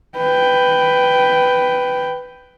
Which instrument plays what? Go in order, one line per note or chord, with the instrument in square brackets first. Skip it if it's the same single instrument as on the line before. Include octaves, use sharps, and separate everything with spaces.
[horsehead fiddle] B4 G5